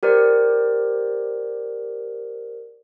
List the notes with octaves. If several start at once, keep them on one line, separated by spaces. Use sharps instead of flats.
G4 A#4 C5 D5